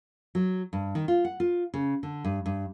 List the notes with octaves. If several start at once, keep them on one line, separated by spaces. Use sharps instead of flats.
F#3
G2
D#3
F4
F#5
F4
C#3
D3
G2
G2